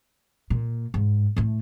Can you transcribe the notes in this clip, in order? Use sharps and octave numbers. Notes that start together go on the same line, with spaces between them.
A#2
G#2
A2 A3